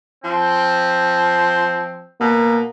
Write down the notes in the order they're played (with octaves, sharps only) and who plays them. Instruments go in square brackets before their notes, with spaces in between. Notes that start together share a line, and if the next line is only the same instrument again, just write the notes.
[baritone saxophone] F3 [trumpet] C4
[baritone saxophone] B2 [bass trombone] A#3